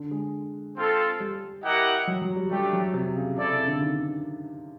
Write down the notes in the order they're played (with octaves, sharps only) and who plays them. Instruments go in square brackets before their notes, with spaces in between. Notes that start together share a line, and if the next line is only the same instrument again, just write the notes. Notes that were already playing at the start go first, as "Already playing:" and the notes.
Already playing: [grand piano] D3
G#3
[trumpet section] C4 F4 A4
[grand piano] G3
[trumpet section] E4 G4 A#4 D#5 F#5
[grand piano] F#3
F#3
G3
[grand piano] G3 [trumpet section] A3 D4 G4
[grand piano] F#3
C3
C#3
[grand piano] C3 [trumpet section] E4 A4 D5
[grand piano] C#3
D3
D#3